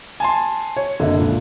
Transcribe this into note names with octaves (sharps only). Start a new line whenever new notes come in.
G#5 A5 C6
C#5
F#1 D3 D#5 E5
C#2 A#2